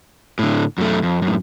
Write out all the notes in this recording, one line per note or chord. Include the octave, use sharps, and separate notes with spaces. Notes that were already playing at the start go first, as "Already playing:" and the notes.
A2 D3
F#2 A3
F2
F#2 A2